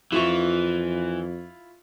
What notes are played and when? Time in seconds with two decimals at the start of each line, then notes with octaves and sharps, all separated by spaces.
0.12 F2 E3 E4 F4 C#6